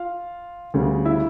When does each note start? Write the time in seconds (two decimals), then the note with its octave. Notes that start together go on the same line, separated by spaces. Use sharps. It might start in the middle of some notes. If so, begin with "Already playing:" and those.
Already playing: F4 F5
0.74 D2 C#3 G3
1.05 E4 E5